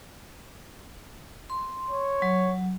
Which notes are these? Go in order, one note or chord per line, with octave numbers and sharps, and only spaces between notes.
C6
C#5
F#3